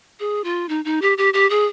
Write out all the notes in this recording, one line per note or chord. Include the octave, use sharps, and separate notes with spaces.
G#4
F4
D#4
D#4
G4
G4
G4
G#4